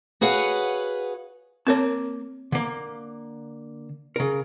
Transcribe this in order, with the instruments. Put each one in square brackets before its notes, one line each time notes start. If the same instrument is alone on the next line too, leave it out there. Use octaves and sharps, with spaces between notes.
[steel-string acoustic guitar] F#4 G#4 B4 C#5 F5 F#5
[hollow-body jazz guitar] A#3 A5 [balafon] C4 A#4 C#5
[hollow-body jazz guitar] D3 A#3
C#3 A#4